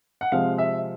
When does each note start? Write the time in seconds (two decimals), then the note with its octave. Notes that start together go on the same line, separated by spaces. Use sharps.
0.21 F#5
0.32 C3 F3 G#3 F5
0.58 E5